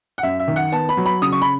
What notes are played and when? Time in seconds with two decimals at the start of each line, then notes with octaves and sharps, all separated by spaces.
0.18 F#5
0.23 F#2 E5
0.40 E5
0.48 D#3
0.56 F#5
0.72 B3 A5
0.89 B5
0.97 F#3
1.06 B5
1.22 C#3 D#6
1.32 C#6
1.42 B5